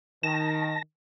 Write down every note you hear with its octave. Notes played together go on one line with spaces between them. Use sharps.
D#3 A5 A#6